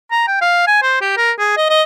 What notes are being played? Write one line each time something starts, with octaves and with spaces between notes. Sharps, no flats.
A#5
G5
F5
G#5
C5
G4
A#4
G#4
D#5
D#5